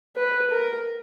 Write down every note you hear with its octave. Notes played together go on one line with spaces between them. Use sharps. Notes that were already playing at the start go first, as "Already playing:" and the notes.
B4
A#4